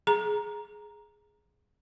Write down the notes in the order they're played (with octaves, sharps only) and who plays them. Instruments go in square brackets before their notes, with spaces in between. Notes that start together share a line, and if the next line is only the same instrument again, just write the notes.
[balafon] G#4 A#5